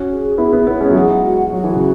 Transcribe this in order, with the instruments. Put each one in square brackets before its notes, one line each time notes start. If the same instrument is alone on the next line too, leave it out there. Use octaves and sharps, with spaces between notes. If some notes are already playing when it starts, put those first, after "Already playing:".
Already playing: [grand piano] C#4 F#4
[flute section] G#4
[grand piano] B3 E4 [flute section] G#4
[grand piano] B3 E4
[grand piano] B3 E4 [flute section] C#5
[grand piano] G#3 C#4
F#3
[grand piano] E3 G#3 [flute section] F#5
[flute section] F#4
[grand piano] F#3 [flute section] F#4
[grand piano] E3
C#3